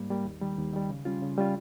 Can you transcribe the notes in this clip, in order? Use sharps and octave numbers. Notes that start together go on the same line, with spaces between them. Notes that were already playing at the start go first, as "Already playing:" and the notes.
Already playing: G#2 G3 A#3
G3 A#3
D#2
D#3 G3
D#2
D#3 G3
C#3
G3 C#4 F4
C#3
G3 C#4 F4